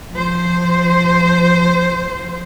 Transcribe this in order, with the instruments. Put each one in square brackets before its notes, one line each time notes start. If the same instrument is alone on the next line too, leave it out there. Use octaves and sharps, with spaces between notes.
[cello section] F3 C5